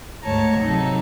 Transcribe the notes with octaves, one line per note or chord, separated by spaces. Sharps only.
D2 G#2 C#5 A5 A#5
C3 F#3 D#4 A4